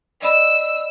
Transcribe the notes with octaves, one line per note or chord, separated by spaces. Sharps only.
D5 D#5 B5 E6